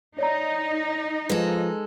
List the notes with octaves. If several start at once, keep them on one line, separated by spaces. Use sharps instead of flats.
D#4 C#5 D5 A#5
F3 G#3 A4 B4